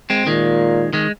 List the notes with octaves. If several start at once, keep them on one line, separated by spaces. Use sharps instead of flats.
G#3 C4
A#2 D#3 G#3
D#3 G#3